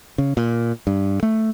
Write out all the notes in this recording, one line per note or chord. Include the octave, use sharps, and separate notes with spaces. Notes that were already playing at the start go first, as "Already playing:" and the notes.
C#3
A#2
G2
A3